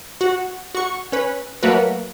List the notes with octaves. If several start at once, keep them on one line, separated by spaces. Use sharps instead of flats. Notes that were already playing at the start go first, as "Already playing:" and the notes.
F#4
F#4 C#6
C#4 B4
F#3 A3 A#3 F#4 A#4 B4